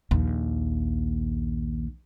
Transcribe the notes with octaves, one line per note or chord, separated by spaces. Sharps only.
A#1 D#2